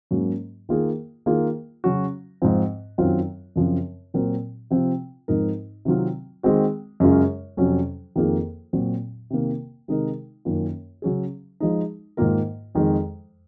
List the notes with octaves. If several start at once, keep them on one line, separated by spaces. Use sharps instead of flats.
G#2 F#3 A#3 C#4 F#4
D#3 A#3 F4 G#4
D#3 A#3 F4 G#4
C#3 F#3 C#4 F#4
G#2 F3 C4
F#2 D#3 F#3 C4 F4
F#2 C#3 F3 C4
A#2 F#3 C4 F#4 A#4
C3 F3 C4 F4
G#2 F3 C4 D#4 A#4
C3 D#3 F#3 C4 F4
D#3 G#3 C4 F#4
F#2 C#3 G#3 C#4 F4
F2 C3 F#3 C#4
F2 D#3 A#3 F4 G#4
A#2 F#3 C4 F#4
C3 D#3 A#3
C3 D#3 G#3 D#4 A#4
F#2 D#3 A#3 C#4 F4
C#3 F#3 C#4 G#4
F3 G#3 D#4
G#2 D#3 A#3 F4 A#4
F2 D#3 G#3